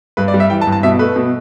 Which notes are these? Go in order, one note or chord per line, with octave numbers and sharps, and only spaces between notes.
G2 B4
D5
G3
E5
E3 G5
A5
G2
A5
B2 E5
A3 B4
B2